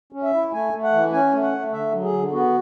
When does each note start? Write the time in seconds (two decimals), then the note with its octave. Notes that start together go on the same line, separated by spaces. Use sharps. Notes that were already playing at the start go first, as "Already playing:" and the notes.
0.13 C#4
0.23 E5
0.33 E4
0.53 A3 G#5
0.73 A3
0.83 F#5
0.92 E3
1.12 C#4 G#5
1.33 A3
1.43 F#5
1.53 A3
1.72 D3 E5
1.92 F#3
2.03 G#4
2.13 D3
2.32 B3 F#4